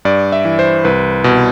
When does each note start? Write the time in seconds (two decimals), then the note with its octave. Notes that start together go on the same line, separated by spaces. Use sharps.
0.05 G2 D5
0.32 E5
0.45 E3
0.59 C5
0.85 C2 B4
1.24 B2